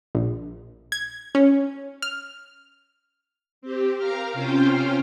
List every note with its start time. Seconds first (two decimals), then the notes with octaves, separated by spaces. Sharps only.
0.15 A#1
0.92 G#6
1.35 C#4
2.02 F6
3.62 C4 G4
3.98 A#4 F5 A#5 F6
4.33 C3 C#4 F4 C5 F5 G5